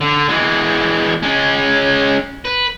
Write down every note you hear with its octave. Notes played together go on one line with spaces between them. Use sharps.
D3
E3 G#3
G#3 C#4
B4